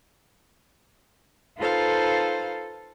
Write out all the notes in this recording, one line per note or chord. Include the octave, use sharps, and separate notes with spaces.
D#4 F4 A4 B4 C5 F5